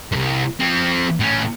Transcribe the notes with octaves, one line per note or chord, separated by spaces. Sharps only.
C2 F#2
F3 C4
A2 C#4